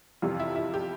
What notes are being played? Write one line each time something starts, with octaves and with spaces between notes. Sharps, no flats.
F2 C3 E3 G3 F4
E4
E4
G4